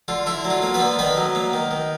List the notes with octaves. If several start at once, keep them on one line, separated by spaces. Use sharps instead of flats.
D3 F4
D3 E4
F#3
F4
A#3
B3 B4
D3
D#3 B3 B4
F#3
A#3
D#3
D#3